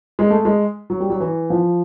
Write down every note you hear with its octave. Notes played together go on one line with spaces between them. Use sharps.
G#3
A3
G#3
F#3
G3
F#3
E3
F3